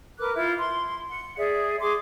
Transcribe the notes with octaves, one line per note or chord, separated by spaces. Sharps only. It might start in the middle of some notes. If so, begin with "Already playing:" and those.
A#4 B4 D6 F#6
E4 F4
C6
F#5
G#4 D5 E5
G#4 C6 D6